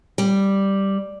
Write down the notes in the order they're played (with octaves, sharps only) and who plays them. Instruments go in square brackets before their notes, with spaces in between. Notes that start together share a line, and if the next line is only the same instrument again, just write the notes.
[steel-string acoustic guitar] G3